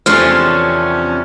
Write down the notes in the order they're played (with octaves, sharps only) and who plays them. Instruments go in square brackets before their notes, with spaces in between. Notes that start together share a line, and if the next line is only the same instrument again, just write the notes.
[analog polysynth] E2 C3 C#4 [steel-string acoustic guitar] F3 A3 D4 [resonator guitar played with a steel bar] C5 [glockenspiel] F6